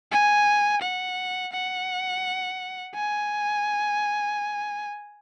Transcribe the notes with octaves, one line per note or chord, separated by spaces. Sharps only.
G#5
F#5
F#5
G#5